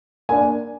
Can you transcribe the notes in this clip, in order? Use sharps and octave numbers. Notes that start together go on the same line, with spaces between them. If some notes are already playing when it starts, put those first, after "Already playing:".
A#3 D4 G#5